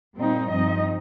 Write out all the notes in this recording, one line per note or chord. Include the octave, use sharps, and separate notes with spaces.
A#2 G3 C4 D#4
G2 F3 C4 D#4 D#5